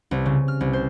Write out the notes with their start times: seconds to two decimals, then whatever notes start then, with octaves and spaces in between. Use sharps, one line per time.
0.11 C2
0.26 C#3
0.48 F6
0.61 C2
0.73 C5